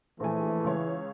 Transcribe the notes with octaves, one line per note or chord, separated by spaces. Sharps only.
A#1 E3 A3 G#5
C#2 C#5